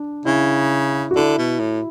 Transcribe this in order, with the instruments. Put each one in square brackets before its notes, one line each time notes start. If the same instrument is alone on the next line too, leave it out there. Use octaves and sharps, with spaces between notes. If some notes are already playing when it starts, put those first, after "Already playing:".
Already playing: [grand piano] D4
[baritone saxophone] C#3 [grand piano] E4
[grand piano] F#4
[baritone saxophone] D3 [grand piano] E4
[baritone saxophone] B2
A2